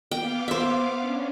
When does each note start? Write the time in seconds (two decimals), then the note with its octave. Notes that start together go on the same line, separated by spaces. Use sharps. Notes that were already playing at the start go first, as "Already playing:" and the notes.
0.11 B3 F5 G5 D6
0.48 C5 E5
1.00 C#4 D4